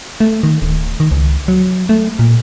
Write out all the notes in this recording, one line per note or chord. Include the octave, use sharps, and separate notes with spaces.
A3
D#3
D1
D#3
C#2
F#3
A3
A#2